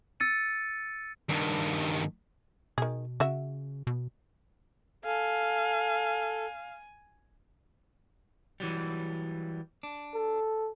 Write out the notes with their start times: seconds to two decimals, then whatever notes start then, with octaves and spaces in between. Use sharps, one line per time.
0.20 E6 A6 C#7 D#7
1.29 G2 D#3
2.78 B2 D#3 G#4
3.20 C#3 F#4 E5
3.87 B2
5.05 A4 F5 G#5
8.60 E3 F#3 G3
9.83 D4
10.14 A4